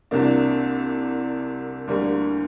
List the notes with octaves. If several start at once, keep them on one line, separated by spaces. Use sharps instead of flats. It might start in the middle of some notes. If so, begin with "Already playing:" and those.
C2 C3 A#3 D4
D2 D3 G3 A#3